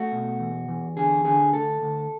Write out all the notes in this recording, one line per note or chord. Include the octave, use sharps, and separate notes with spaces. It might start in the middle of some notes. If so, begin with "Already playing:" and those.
Already playing: A3 F#4
B2
E2
E2
D3 G#4
D3 G#4
D2 A4
D2